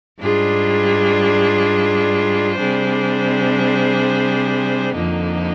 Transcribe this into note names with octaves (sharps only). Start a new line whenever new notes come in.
G#2 G3 D4 F4 G#4
C3 G3 D4 G#4 C5
F2 D3 F3 A#3 D#4